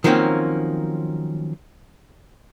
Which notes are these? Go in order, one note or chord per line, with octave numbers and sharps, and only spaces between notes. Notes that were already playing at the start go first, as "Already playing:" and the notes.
D#3 F3 F#3 A#3 C4 C#4